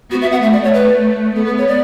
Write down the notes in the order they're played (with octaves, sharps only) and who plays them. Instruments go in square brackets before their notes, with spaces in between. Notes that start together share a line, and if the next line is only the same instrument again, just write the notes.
[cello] B3 [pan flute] F#4
[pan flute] E5
F#5
[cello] A3 [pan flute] E5
[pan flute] D5
C#5
B4
[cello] B3 [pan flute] A4
[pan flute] B4
C#5
D5